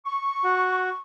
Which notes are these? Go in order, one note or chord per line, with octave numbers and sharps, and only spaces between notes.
C#6
F#4